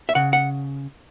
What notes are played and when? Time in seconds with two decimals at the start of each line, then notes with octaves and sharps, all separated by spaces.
0.09 E5
0.15 C#3 F#5
0.33 F#5